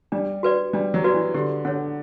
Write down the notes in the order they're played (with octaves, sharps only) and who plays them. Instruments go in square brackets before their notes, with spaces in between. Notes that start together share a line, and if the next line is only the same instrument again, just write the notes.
[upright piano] G3 [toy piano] D4
[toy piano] F#4 B4 D5
[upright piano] G3 [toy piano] D4
[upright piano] F#3
[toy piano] F#4 B4 D5
[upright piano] E3
[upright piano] D3 [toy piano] G4
[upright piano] D3 [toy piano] C#5 F#5